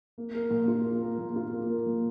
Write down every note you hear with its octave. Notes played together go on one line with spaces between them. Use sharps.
A#3
A#4
A#2
F4
A#3
A#4
A#2
F4
A#3
A#4
A#2